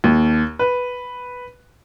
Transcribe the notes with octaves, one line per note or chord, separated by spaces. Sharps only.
D#2
B4